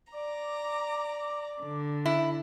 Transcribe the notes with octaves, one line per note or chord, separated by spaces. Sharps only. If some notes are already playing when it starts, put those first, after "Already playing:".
D5 A#5 D6
D3
E4